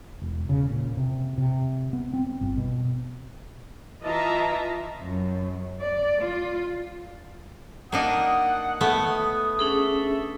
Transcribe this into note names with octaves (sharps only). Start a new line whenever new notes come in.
E1
C#3
A#2
C3
C3
B3
C4
G1
B2
E3 F4 D#5 E5 A5 A#5
F#2
D5
F4
A#3 D4 D#4 F#5 D#6
A3 B3
C#4 D4 G#4 A4 E5